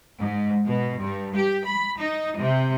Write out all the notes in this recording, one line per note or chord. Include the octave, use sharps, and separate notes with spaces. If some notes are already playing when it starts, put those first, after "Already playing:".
G#2
B2
G2
G4
B5
D#4
C3